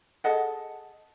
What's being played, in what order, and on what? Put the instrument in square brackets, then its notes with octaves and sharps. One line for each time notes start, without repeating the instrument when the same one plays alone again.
[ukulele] G#4 A4 D#5 F#5